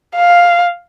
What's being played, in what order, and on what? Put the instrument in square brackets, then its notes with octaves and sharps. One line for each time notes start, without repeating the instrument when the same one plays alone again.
[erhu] F5